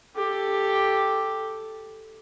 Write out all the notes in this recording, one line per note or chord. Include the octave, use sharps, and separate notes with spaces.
G4 A4